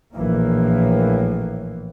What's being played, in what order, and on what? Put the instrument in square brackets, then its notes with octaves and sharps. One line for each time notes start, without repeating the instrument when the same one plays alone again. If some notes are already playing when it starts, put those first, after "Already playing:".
[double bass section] A#1 A2 E3 A#3